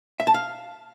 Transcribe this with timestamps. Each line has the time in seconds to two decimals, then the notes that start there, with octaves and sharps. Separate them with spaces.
0.20 E5
0.27 A5
0.34 F5